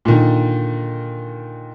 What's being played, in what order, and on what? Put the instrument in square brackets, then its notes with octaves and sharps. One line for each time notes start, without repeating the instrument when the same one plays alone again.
[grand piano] A#2 D3 D#3